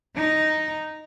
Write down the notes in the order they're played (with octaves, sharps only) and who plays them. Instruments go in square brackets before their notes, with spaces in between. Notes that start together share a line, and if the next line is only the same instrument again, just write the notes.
[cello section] D#4